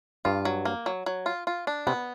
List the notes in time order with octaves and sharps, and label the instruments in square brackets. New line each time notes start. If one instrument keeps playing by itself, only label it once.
[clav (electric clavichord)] G2 [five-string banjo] F4
[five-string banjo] F#3
A#3
F#3
F#3
F4
F4
D4
[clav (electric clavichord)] C3 [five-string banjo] B3